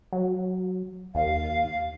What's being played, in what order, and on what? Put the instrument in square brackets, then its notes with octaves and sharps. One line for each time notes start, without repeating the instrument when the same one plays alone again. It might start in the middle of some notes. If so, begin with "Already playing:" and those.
[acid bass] F#3
[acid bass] D#2 [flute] F5